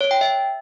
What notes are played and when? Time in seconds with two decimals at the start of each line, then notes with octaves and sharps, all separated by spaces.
0.01 C#5
0.11 G5
0.21 E5